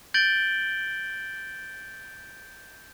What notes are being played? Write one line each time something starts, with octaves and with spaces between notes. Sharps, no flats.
G6 A6 D7 F#7 G7